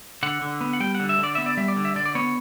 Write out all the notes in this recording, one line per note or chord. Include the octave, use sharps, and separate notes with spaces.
D3 F#5
D3
B3
F#5
G3 G5
F#5
D3
E5
D3
D5
B3 E5
D5
G3 E5
D5
D3
E5
D3 D5
D5
B3 C#5